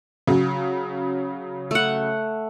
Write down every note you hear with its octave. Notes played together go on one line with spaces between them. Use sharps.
C#3 F#3
A3 F#5